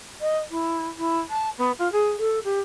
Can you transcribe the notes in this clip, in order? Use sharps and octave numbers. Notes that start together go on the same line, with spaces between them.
D#5
E4
E4
A5
B3
F4
G#4
A4
G4